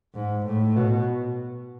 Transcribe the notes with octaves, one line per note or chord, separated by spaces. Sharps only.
G#2
A2
B2